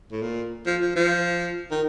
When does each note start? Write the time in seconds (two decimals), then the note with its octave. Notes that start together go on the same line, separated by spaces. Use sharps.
0.11 A2
0.22 A#2
0.66 F3
0.82 F3
0.96 F3
1.71 D#3